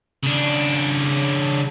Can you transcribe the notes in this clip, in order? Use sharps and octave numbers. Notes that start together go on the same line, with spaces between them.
C#3 D4